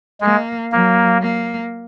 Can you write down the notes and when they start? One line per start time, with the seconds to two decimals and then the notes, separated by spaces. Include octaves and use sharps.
0.21 G#3 A#3
0.72 F#3 A#3
1.22 A#3